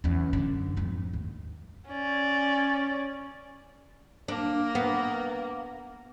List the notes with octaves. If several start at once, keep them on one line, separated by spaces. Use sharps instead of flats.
E2 C#4
F#2 D3
F2 G#2
D#2
C#4 D5
A#3 D4 A#5
B3